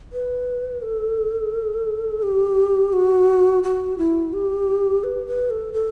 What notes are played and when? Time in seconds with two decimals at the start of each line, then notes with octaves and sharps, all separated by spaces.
0.13 B4
0.82 A4
2.23 G4
2.93 F#4
3.63 F#4
3.98 E4
4.33 G4
5.04 B4
5.27 B4
5.50 A4
5.73 A4